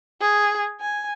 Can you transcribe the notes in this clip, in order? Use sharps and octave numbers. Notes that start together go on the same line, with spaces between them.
G#4
G#5